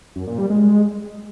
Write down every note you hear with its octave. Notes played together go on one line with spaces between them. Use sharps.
F#2
A#2
G3
G#3